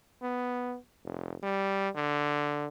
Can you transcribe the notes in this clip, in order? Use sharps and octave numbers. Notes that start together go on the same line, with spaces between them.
B3
F1
G3
D3